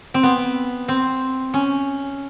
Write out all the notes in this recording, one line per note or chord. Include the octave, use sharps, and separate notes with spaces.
C4
B3
C4
C#4